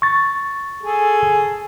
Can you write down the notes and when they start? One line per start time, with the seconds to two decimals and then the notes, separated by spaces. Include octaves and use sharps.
0.02 C#6 A6
0.83 G#4 A4